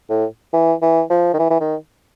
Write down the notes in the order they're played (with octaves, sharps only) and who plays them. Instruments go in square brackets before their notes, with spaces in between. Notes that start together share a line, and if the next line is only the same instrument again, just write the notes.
[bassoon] A2
E3
E3
F3
D#3
E3
E3
D#3